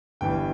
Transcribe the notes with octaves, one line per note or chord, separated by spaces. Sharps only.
G1 G2 E3 G5